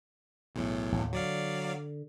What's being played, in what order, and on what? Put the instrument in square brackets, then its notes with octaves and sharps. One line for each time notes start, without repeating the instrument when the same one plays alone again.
[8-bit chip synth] B1 E2 A2
[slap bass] A1 D#2
[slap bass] D3 [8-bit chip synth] F#3 D5 F5